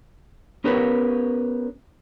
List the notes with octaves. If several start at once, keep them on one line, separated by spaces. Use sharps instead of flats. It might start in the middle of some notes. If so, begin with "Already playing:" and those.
B3 C#4 G4 A#4 B4 C#5